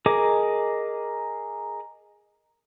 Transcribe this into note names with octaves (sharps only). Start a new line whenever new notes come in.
G#4 A#4 D#5 D6